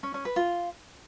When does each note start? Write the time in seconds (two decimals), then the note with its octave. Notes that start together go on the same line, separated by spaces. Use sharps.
0.03 C#4
0.14 C#4
0.25 B4
0.36 F4